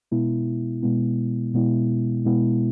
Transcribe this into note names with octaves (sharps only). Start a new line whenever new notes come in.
B2 G#3 B3 E4
B2 G#3 B3 E4
B2 G#3 B3 E4
B2 G#3 B3 E4